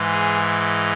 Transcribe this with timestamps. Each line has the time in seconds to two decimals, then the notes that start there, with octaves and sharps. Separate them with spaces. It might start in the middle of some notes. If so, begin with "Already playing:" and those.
Already playing: G#2 E3 G#3
0.12 G#4